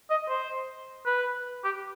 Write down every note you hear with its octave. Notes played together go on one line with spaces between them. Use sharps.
D#5
C5
B4
G4